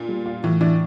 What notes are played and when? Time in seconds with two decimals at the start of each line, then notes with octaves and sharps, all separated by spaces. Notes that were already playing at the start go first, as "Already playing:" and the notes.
Already playing: A#2 D4 F4
0.09 G3
0.26 F4
0.43 A2 E3
0.61 E3 D4